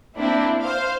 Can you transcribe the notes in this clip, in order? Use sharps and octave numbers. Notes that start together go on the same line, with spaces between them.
A#3 C4 D4 E4
C5 F5